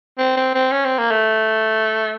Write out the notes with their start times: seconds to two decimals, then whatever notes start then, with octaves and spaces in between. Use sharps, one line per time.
0.18 C4
0.37 C4
0.55 C4
0.72 C#4
0.85 C4
0.98 A#3
1.11 A3